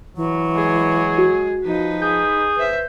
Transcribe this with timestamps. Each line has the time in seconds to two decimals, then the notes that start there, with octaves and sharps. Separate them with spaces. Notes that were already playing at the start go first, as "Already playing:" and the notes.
0.16 E3 F#3
0.53 G#3 G#4
1.18 F#4
1.65 F3 D#4 B4
2.02 G#4 G6
2.56 B4 C5 E5